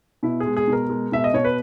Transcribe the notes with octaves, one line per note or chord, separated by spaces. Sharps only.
B2 E4
G#4
G#3
G#4
B2
A#4
G#3
B2 E5
D#5
B2 C#5
B4